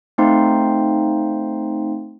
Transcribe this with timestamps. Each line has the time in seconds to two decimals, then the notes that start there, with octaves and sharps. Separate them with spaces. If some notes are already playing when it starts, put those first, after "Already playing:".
0.18 A3 C4 D#4 C5 F5 C6